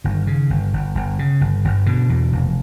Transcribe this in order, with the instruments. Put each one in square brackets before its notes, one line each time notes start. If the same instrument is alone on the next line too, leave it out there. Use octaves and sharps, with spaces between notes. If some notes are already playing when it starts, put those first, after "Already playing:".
[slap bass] G1 D#3
C#3
G1
G1
G1
C#3
G1
G1
B2 D3
E2
F1